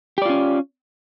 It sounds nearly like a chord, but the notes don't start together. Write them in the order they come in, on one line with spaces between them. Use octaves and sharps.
G4 D5 F4 C#4